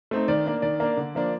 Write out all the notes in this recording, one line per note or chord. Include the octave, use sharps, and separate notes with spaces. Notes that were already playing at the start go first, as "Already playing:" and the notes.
A3 C4 D#4
D#3 D5
A#3 D4
D#3 D5
A#3 D4
D3
F3 A#3 D4